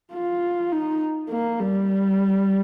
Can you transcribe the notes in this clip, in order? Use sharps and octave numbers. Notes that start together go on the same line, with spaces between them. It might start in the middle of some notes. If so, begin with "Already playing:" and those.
F4
D#4
A#3
G3